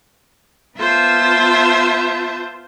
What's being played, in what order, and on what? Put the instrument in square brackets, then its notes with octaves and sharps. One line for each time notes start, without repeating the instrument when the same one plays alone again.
[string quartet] B3 F4 C5 E5 A5